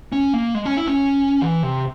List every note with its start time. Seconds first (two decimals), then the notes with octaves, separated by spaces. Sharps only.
0.12 C#4
0.33 A#3
0.55 G#3
0.65 C#4
0.77 E4
0.87 C#4
1.42 E3
1.63 C3